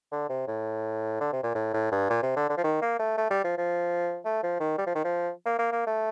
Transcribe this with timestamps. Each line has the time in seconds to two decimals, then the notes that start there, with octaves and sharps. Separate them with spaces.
0.12 D3
0.29 C3
0.47 A2
1.21 D3
1.33 C3
1.43 A#2
1.55 A2
1.74 A2
1.91 G2
2.10 A#2
2.23 C3
2.36 D3
2.49 D3
2.57 F3
2.64 D#3
2.82 A#3
2.99 A3
3.18 A3
3.30 G3
3.44 F3
3.58 F3
4.25 A3
4.43 F3
4.60 D#3
4.78 G3
4.87 F3
4.95 D#3
5.04 F3
5.46 A#3
5.59 A#3
5.72 A#3
5.87 A3